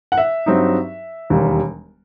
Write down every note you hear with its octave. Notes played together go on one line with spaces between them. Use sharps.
F#5
E5
G2 F#3 C4 D#4
E1 D#2 D#3 G3